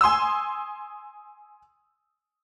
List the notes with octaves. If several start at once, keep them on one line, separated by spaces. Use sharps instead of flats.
G#5 C6 D#6 E6